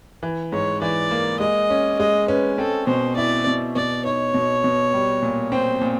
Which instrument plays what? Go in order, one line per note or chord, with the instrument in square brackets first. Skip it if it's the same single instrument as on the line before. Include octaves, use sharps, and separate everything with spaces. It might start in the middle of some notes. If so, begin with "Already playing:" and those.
[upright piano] E3
[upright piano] G#2 [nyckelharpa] C#5
[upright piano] E3 [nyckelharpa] D5
[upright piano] A#3
[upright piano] G#3 [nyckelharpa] D#5
[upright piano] C#4
[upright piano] G#3 [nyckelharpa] D#5
[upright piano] C#4 [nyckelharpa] B4
[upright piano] C4 [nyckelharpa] A4
[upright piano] B2 [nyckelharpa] C5
[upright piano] E4 [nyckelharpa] D5
[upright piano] B2
[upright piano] B2 [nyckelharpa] D5
[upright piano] D#4 [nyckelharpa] C#5
[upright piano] B2
B2
G3
A#2
[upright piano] C4 [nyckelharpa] C5
[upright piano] A#2